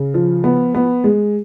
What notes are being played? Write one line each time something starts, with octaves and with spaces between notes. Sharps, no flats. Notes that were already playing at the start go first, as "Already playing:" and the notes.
Already playing: C#3
F3
B3
B3
G#3